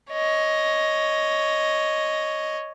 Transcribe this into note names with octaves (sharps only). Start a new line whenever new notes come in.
C#5 D#5